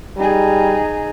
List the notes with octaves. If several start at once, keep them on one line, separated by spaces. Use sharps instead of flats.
G3 D#4 G#4